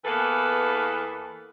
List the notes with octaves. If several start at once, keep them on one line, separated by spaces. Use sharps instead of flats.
E2 E3 A#3 B3 A4 B4